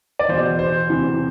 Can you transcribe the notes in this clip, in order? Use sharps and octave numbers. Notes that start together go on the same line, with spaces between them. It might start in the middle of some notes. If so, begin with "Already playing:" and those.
D5
E2 B2 C5
C5
E2 C3 E3